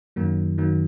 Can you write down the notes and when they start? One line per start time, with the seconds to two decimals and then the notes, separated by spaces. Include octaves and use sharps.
0.16 F#2 D#3 F#3 A#3
0.58 F#2 D#3 F#3 A#3